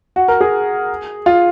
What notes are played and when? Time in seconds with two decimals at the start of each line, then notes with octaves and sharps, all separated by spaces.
0.16 F#4
0.28 A#4
0.41 G#4
1.26 F4